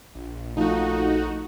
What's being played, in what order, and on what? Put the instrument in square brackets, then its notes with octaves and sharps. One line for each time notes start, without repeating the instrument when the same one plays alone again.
[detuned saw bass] A#1
[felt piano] F3 [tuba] A3 [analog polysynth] D#4 F#4